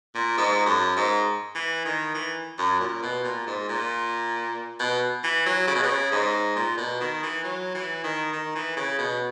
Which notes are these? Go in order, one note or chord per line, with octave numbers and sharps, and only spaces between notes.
A#2
G#2
F#2
G#2
E3
D#3
E3
F#2
A#2
B2
A#2
G#2
A#2
B2
E3
F#3
C#3
B2
C#3
G#2
A#2
B2
D#3
E3
F#3
E3
D#3
D#3
E3
C#3
B2